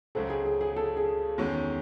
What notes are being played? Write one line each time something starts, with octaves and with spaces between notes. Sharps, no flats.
C#2 C#3 F#3 C4 A4
G#4
G#4
G#4
A4
G#4
E2 D#3 G#3 C#4 F#4